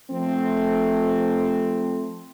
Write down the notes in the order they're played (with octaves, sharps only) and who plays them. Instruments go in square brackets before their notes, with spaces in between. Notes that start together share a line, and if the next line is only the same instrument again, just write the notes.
[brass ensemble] F3 A3 C4